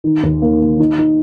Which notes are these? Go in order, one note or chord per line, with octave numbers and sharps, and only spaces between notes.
D#3
D#2
A#3
A#3
D#4
D#4